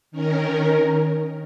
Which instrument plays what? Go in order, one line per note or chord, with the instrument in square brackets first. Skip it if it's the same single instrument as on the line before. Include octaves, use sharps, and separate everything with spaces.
[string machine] D#3 C#4 A#4